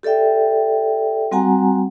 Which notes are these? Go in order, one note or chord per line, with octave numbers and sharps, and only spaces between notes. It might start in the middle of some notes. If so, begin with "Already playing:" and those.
G4 A4 D5 E5 G5
G3 C4 F#4 F#5 G#5 A#5